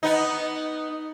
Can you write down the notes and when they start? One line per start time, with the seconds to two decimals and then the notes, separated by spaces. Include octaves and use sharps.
0.03 B3 D#4